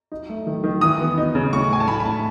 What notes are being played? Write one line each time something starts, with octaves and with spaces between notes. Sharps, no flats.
D#4
A3
D#3
D#3
E3 D#6
B3
D#4
C#3
A2 C#6
A2 G#5
A5
A2 B5
B5
A2 A5